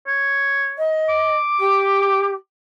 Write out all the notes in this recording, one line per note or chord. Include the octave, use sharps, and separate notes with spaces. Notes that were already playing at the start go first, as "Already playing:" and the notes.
C#5
D#5
D6
G4